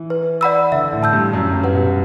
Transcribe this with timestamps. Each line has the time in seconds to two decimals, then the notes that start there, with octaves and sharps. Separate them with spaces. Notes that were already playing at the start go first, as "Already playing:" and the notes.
Already playing: E3
0.10 B4
0.41 D5 F#5 B5 E6
0.72 D3 E5
0.93 A2
1.03 A5 E6 G6
1.13 G2
1.33 F#2 G4
1.54 G2
1.64 B4 F#5
1.74 B2